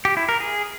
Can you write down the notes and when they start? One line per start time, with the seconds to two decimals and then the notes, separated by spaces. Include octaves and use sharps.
0.05 G4
0.17 E4
0.29 A#4
0.40 G#4